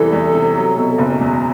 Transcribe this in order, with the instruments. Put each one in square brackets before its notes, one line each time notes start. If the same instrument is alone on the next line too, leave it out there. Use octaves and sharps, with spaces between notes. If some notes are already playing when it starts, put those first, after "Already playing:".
Already playing: [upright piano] E2 C3 E3 G3 [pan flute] A4
[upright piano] E2
C3
F#3
B2
F#1
E2